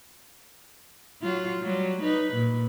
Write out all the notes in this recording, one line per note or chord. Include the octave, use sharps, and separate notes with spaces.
F#3 F4
F#3 G3
D#4 B4
A#2